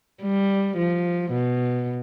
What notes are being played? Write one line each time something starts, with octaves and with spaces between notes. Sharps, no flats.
G3
F3
B2